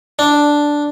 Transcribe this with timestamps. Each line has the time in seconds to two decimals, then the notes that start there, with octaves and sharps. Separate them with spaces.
0.19 D4